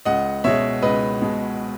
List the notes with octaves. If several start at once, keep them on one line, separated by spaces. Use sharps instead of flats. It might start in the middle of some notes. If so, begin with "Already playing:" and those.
C#2 D#5 F#5
B2 G#3 C#5 E5
C#2 B4 D#5
B2 G#3